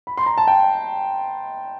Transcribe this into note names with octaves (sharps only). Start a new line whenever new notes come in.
B5
C6
A#5
A5
G5